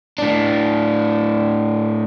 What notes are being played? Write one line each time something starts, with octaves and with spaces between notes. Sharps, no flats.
A2 D4